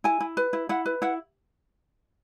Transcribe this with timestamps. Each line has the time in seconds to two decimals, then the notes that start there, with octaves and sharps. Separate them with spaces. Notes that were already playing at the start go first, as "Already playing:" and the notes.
0.04 E4 G#5
0.20 E4
0.37 B4
0.53 E4
0.69 E4 F#5
0.86 B4
1.02 E4 F#5